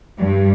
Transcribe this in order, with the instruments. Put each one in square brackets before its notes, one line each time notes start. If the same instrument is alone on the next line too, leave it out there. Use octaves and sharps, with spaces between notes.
[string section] G2